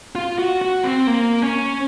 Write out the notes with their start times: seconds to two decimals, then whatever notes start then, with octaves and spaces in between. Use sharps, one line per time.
0.15 F4
0.39 F#4
0.62 F#4
0.84 C4
1.07 A#3
1.42 C#4